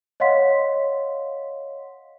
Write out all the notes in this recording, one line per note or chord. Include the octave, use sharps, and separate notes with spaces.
C#5 D#5 F5 F#5 C6 B6